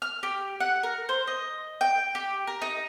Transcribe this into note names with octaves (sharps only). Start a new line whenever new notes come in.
F6
G4
F#5
A#4
C5
D#5
G5
G4
A#4
D#4